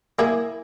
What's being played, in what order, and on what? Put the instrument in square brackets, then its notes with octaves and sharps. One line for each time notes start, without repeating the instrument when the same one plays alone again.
[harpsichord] A#3 [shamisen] E4 G#4